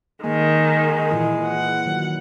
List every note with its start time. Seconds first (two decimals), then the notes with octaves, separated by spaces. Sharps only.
0.24 D#3 G#3 A#3
1.11 A#2 E3 E4
1.47 F#5
1.86 D#3 F#3